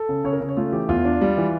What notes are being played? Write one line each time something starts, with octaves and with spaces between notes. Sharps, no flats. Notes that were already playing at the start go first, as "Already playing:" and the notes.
Already playing: A4
C#3
C#3 C#5
A#4
C#3
C#5
A3 F4
E3 G4
E2 F4
D4
G3
E3